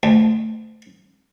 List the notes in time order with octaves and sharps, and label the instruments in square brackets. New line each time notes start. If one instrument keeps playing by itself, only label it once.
[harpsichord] D2